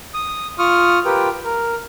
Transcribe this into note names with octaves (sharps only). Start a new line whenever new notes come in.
D#6
F4 C#6 D#6 F6
F4 G4 A#4 B4 G5
A#4